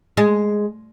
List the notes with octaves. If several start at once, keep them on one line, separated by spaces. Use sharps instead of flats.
G#3